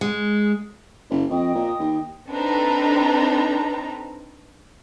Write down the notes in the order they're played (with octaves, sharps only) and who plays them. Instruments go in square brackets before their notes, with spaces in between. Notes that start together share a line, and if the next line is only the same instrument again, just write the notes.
[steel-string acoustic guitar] G#3
[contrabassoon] F#1
[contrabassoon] F2 [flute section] D#5 G5 D#6
[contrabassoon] A#2
D#2
[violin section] C4 D4 D#4 A4 B4 A#5